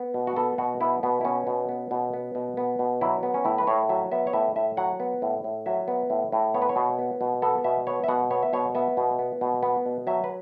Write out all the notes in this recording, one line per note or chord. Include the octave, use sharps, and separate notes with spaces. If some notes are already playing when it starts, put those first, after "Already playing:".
Already playing: B3
B2
F#4
B3 A4
B2 F#4
B3 E4
B2 B3
E4
B3 C#4
B2
B3
B2
B3
B2
B3
B2
F#3 E4
B3
C#4
A2 E4
B4
A2 C#5
F#3 E5
B3 E5
C#5
A2 E5
A2 E5
F#3 F#5
B3
A2
A2
F#3 E5
B3
A2
A2
B3 C#5
B4
C#5
B2
B3
B2
B3 A4
B2 E5
B3 C#5
E5
B2 F#5
B3 C#5
E5
B2 C#5
B3 E5
B2
B3
B2
B3
B2
F#3 E5
B4